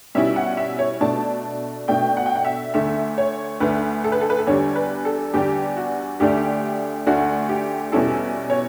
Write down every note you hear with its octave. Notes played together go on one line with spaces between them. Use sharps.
B2 G3 C#4 E4 E5
F#5
E5
C#5
B2 A3 D4 A5
B2 A3 D4 G5
F#5
G5
F#5
E5
D2 D3 A3 E5
C#5
D2 D3 A3 B4
A4
B4
A4
B4
A4
E2 D3 G3 D4 C#5
B4
A4
E2 D3 G3 D4 G4
F#4
D2 D3 A3 D4 G4
D2 D3 A3 D4 F#4
G4
E2 B2 G3 C#4 E4 A4
C#5